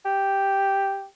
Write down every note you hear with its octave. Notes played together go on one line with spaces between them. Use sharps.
G4